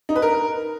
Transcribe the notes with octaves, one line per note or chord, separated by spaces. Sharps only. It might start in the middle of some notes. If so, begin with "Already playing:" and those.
D#4
B4
A#4